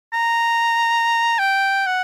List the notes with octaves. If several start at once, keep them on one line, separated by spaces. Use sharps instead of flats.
A#5
G5
F#5